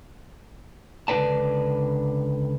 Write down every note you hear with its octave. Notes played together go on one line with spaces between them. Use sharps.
C#2 D3 D4 B4 D5 A5